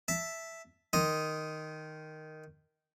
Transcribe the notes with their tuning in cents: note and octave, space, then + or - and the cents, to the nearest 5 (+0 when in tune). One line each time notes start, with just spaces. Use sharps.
E5 +0 A5 +0
D#3 +0 D#5 +0 C6 +0